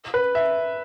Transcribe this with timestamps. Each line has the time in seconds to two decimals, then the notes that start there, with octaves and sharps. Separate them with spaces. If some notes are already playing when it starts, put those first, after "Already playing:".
0.14 B4
0.35 E5